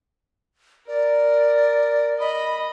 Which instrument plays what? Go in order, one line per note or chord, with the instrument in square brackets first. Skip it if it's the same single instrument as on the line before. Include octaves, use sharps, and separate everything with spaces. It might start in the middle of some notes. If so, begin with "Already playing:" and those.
[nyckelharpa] A#4 [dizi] D5
[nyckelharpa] D#5 [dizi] B5